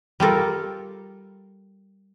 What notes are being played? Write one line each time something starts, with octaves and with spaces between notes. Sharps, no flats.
G3 F4 A4 A#4